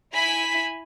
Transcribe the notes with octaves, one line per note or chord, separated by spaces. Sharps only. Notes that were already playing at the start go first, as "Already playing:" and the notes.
E4 G#5 B5 B6